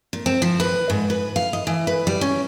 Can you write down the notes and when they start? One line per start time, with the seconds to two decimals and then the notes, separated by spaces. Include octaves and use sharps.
0.13 A#2
0.26 C4
0.42 F3
0.60 B4
0.90 G#2
1.10 B4
1.36 F5
1.53 D#5
1.67 E3
1.87 B4
2.07 G3
2.21 C#4